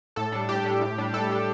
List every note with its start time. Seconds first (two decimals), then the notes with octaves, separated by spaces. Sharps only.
0.16 A2 A4
0.32 G3 D4
0.49 A2 G4
0.65 G3 D4
0.81 A2
0.98 G3 D4
1.13 A2 A4
1.30 G3 D4